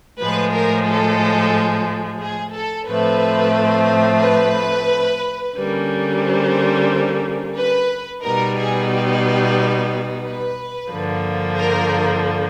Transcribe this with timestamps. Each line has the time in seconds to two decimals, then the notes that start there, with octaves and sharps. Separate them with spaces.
0.21 A2 F3 G#3 B4
0.54 A#4
0.88 A4
2.21 G#4
2.54 A4
2.88 A2 F3 A3 C4 B4
4.22 B4
5.55 D3 G3 A#3 C#4
6.23 C5
7.57 B4
8.23 B2 G3 B3 D#4 A#4
8.57 G#4
8.91 G4
10.24 B4
10.92 G2 D3 F3 A#3
11.58 A#4